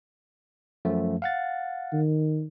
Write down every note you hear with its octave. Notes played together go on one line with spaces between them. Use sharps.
F#2 F3 A3
F5 F#5 A6
D#3